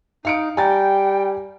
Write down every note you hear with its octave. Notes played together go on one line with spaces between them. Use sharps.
D#4 F5 C#7 D7
G3 G5 G#5 A#5 A6